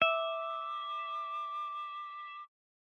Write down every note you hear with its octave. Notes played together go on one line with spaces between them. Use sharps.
E5 D6